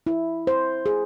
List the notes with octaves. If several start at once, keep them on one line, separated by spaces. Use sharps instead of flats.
E4
C5
G#4